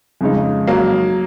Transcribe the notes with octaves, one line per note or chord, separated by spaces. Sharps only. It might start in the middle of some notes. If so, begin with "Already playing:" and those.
F2 C#3 G#3 D#4
F#3 A#3